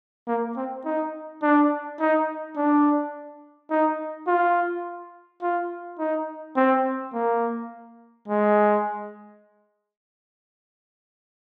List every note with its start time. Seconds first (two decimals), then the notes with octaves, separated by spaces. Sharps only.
0.27 A#3
0.57 C4
0.85 D#4
1.42 D4
1.99 D#4
2.56 D4
3.71 D#4
4.27 F4
5.42 F4
5.99 D#4
6.57 C4
7.13 A#3
8.28 G#3